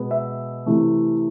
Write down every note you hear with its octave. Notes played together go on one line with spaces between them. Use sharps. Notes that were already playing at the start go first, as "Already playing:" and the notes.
Already playing: B2 G#3 B3
E5
C3 E3 A3